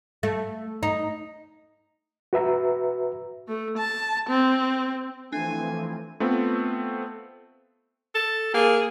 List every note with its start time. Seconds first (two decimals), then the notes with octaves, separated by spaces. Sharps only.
0.23 A3
0.83 D#4
2.33 F#4 B4 E5 A#5
3.48 A3
3.77 A5
4.29 C4
5.33 E3 F3 A3 C4 D4 G#5
6.20 A3 B3 C4 F4
8.14 A4
8.54 A#3 G#4